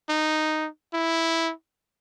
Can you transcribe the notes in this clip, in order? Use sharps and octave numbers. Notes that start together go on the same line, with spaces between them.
D#4
E4